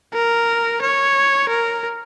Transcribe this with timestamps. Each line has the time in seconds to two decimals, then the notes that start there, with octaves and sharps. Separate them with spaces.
0.13 A#4
0.81 C#5
1.49 A#4